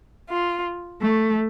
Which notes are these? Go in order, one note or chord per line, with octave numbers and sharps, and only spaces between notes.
F4
A3